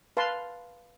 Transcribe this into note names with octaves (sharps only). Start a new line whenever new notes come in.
B4 F5 A5 C6